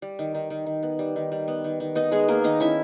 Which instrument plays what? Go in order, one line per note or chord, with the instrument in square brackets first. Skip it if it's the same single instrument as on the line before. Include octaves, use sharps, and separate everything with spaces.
[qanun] G3
D#3
D#3
D#3
D#3
B3
G3
D#3
G3
B3
D#3
D#3
B3 D#4 D#5
G#3 B3 G#4
D#3 A#3 A#4
D#3 D#4 D#5
C#4 E4 E5